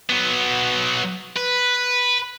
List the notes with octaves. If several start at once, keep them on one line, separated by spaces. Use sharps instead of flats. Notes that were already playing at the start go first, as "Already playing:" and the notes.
F#3 B3
B4